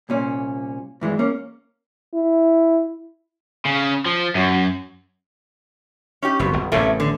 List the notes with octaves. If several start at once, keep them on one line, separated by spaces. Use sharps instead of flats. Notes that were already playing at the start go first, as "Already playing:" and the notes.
C2 A#2 C#4
G2 E3 G#3
A#3 C#4
E4
C#3
F3
F#2
C#4 D#4 G4
F#1 F2 B2
G1
A1 E2 C3 A3 A#3 C#4
D3